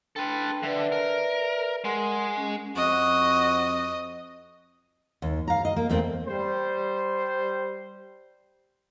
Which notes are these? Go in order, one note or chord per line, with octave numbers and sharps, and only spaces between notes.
D4 A4 B4 G5 C6
D3 B4 D5 E5
A#4
G#3 A#4 F#5 C6
C#4
F2 F#4 D#5
D#2
F5 A#5
D#5
A#3
E2 A3 A#3 C4
G3 C5